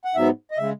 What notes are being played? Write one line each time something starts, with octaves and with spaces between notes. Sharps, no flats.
F#5
G#2 F#3 B3 E5
D#5
C#3 G#3 E5